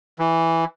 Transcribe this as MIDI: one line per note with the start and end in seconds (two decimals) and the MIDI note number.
0.19 0.65 52